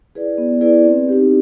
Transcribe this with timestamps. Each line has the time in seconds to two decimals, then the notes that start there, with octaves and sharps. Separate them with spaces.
0.15 E4 G#4 B4 D5
0.38 B3
0.61 E4 G#4 B4 D5
0.85 C4
1.08 D#4 G4